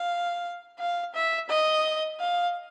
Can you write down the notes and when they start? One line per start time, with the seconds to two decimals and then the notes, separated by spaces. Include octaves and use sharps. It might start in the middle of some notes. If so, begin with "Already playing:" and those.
Already playing: F5
0.79 F5
1.14 E5
1.49 D#5
2.20 F5